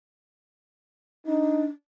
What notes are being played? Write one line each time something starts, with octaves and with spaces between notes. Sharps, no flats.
D4 D#4